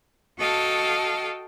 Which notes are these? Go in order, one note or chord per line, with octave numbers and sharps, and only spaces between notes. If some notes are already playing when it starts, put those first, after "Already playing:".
F#4 A4 D#5 F5 G5 A5